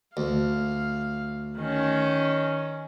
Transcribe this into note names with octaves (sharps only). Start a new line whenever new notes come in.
D2 F5
D#3 C#4